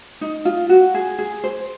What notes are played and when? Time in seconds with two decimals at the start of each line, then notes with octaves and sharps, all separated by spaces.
0.21 D#4
0.45 F4
0.69 F#4
0.95 G#4
1.19 G#4
1.44 C5